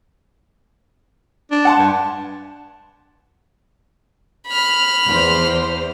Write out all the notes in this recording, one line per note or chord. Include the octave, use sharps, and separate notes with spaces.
D4
F#5 A5 C6
G2
B5 F6
E2 C5